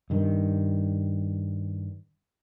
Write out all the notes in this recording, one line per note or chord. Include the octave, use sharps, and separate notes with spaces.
G2 D#3